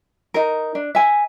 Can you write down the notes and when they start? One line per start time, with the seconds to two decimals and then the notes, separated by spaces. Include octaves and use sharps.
0.34 D#4 A#4
0.75 D4
0.95 E5 G#5